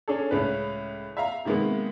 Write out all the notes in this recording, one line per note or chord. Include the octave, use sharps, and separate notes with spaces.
C#4 D4 G#4 A4
C#2 A2 C#4 B4
E5 F5 A#5
C3 D#3 G#3 A#3 B3